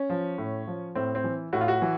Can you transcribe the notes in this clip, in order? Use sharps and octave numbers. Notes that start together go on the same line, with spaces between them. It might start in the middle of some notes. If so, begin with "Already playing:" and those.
Already playing: C#4
F3
A2
F3
A2 C4
C4
E3
A2 F#4
F4
F#4
E3